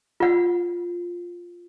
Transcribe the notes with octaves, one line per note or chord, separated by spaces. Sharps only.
F4 F#5